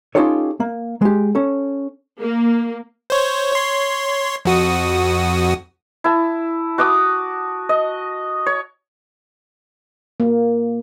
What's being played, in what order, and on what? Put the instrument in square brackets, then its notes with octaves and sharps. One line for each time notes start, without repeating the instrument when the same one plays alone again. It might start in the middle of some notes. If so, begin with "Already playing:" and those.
[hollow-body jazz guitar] C#4 D#4 F4 G4 A4 C#5
A#3
G#3 G4
C#4 A4
[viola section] A#3
[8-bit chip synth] C5 C#5
C#5 C6
F2 F#4 D#6
[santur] E4 A5
F#4 A5 D6 D#6
D#5
C#5
[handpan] A#3